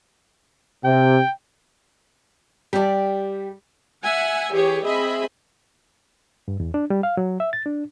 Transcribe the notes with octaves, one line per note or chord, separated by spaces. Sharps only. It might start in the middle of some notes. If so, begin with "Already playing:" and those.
C3 G5
G3 G4 D5
E5 F#5 G#5
E3 G4 G#4 C#5
C4 G#4 D#5 E5 B5
G2
E2
D4
G3
F5
F#3
E5
A6
D4